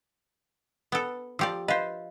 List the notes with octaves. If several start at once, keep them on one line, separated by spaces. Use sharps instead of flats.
B3 A4
F3 G4 D5 E6
B4 C5 D#5 F5